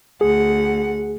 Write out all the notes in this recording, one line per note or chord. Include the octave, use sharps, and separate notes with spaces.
D2 G#4 F#5